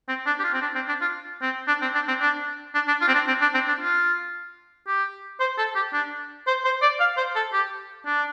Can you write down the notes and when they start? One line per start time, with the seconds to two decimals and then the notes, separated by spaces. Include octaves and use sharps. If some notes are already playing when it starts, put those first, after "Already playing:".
0.08 C4
0.26 D4
0.39 G4
0.44 F4
0.54 C4
0.62 D4
0.75 C4
0.88 D4
1.01 F4
1.41 C4
1.68 D4
1.82 C4
1.95 D4
2.08 C4
2.21 D4
2.74 D4
2.88 D4
3.01 F4
3.08 C4
3.14 D4
3.28 C4
3.41 D4
3.54 C4
3.68 D4
3.81 F4
4.87 G4
5.40 C5
5.58 A4
5.75 G4
5.93 D4
6.47 C5
6.64 C5
6.82 D5
7.00 F5
7.17 C5
7.35 A4
7.53 G4
8.06 D4